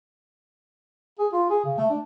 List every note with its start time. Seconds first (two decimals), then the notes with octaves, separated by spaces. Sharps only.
1.19 G#4
1.33 F4
1.50 G#4
1.65 C#3
1.78 A3
1.90 D4